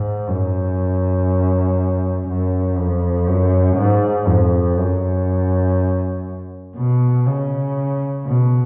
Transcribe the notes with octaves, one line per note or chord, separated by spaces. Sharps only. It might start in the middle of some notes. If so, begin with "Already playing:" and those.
Already playing: G#2
F#2
F#2
F2
F#2
G#2
F2
F#2
B2
C#3
B2